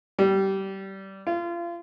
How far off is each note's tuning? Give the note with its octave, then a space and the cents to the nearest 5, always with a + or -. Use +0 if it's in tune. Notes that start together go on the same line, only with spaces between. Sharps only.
G3 -20
F4 -30